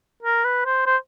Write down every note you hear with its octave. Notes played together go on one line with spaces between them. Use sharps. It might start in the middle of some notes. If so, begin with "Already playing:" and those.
A#4
B4
C5
C5